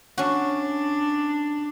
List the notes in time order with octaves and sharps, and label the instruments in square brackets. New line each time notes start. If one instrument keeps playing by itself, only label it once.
[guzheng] C#4 F#4 [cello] D4